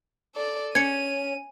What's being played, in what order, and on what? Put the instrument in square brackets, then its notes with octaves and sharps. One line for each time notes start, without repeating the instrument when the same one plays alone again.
[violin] A4 D5
[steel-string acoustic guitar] C#4 [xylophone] G#6 C#7 [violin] D#7